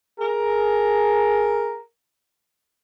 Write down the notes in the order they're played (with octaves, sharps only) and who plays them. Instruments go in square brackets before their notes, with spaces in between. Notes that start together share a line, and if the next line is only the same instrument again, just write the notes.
[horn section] G#4 A#4